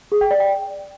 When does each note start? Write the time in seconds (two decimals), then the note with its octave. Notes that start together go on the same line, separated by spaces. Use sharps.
0.12 G#4
0.21 G5
0.31 D5
0.40 G5